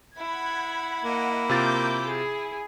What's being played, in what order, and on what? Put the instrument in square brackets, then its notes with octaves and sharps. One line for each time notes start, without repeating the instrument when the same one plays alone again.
[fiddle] E4 [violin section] F#5 B5 G#6
[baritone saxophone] A#3 [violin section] D#5 F#5
[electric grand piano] C3 F4 A6 [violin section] D6 G6
[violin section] G#4